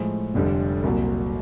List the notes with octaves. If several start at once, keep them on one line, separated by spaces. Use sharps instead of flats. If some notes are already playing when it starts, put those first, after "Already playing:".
Already playing: A2 F3 G#3
F1 F2 D3 G3
C2 A#2 F#3